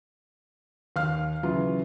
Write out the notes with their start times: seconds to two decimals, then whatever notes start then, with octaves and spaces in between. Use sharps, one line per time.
0.96 D#2 F5 F6
1.43 C#3 E3 F#3 F4